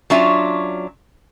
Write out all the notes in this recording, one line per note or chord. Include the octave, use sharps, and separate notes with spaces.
F#3 C#4 D4 F4 E5